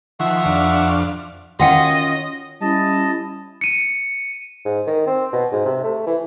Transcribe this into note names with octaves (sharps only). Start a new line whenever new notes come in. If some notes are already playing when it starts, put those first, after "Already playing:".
D#3 F3 E5 F#5 C#6
F2 D4 F5
D#3 C#4 F4 F#4 D#5 F#5 G5
G3 C#4 E4 D#5 A5
C#7 D#7
G#2
D#3
C4
B2
G#2
C3
A3
E3